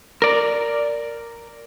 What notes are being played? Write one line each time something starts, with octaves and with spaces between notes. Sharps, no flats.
A#4 D5